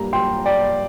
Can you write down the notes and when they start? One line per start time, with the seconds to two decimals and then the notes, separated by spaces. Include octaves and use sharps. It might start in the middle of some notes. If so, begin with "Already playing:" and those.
Already playing: G2 G3 A#3 A#5
0.13 G5 C6
0.46 D5 G5